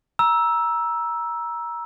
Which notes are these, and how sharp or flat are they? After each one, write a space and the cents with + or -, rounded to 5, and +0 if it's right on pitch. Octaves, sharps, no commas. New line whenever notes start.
A#5 +25 E6 +0